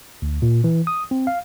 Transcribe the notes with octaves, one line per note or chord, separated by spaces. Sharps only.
D2
A#2
E3
D#6
C4
F5